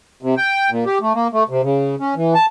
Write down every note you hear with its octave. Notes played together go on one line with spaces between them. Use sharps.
C3
G5
A#2
G4
A3
A#3
A3
C3
C#3
C#4
E3
A5